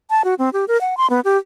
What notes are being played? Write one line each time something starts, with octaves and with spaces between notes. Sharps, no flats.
A5
F#4
C4
G4
A#4
F#5
C6
B3
G4